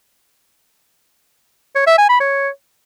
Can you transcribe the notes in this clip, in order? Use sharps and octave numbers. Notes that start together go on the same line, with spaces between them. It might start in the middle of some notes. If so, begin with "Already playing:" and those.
C#5
E5
G#5
B5
C#5